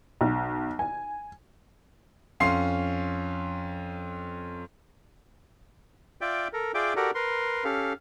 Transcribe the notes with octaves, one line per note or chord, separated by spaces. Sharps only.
B1
G#5
F2 C#4 F5 C6 C7
F4 D5 E5 G5
A4 A#4
F4 G#4 D5 E5 G5 D6
F#4 G4 A4 A#4 D5
A#4 B4 C6
C#4 G4 A4 F5